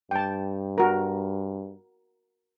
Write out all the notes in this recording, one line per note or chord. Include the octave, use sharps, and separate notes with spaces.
G2 G5 A5
F#4 A#4